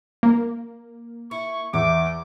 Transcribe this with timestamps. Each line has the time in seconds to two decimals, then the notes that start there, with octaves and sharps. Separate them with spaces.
0.23 A#3
1.31 E4 C#6
1.74 E2 E5 D6